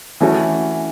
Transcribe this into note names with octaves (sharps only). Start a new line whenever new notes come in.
E3 A3 C#4 F#4